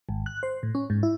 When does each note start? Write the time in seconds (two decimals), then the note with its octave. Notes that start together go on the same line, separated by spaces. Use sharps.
0.09 G#1
0.26 F#6
0.43 C5
0.63 A2
0.75 C#4
0.90 G#2
1.03 E4